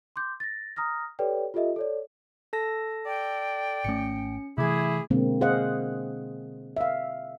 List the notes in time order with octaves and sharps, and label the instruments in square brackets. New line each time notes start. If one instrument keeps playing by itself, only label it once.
[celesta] C6 D6 G6
A6 A#6
A#5 D#6 F6 A#6
G4 A4 B4 C#5 D5 G5
F4 G4 A4 D#5 E5
A4 C#5 D5
[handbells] A4 A5 A#6
[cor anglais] D5 [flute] G5
[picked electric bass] G#1 A3 [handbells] C#4 C#7
[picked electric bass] C3 E3 [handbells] A3 D6 G#6 [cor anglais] E4 [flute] G#4
[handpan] B2 D3 G#3 A#3 C4
G#4 C5 D#5 F5 F#5
E5 F5